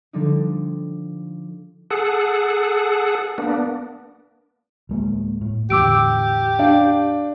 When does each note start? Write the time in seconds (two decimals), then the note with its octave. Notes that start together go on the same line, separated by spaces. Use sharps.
0.13 D3 F3 G3 D4 D#4
1.91 G#4 A4 F#5
3.38 A#3 B3 D4
4.89 D1 G#3 A#3
5.41 A2
5.70 E2 A2 D3 G4 D6 E6 D7
6.59 D4 F5